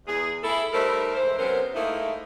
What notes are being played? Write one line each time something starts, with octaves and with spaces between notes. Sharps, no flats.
E2 G#4
E4 G#4 A4
G3 A3 D#4 A4 A#4 C5
G#2 E3 C5
F#2 C3 F#3 B3 A#4 C5
G#2 A3 A#3 D#4 E4